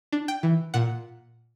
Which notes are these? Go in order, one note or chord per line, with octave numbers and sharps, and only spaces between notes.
D4
G5
E3
A#2 F#5